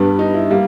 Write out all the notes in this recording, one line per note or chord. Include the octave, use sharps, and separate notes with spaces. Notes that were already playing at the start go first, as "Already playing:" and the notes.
Already playing: G2 G3 B3
D#4
E4
G3 A#3